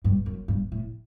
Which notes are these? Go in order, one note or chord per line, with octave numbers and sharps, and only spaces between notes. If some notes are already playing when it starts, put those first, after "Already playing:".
G2
F#2
G2
A2